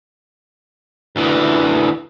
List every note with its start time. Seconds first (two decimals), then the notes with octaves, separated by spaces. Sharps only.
1.16 D2 E3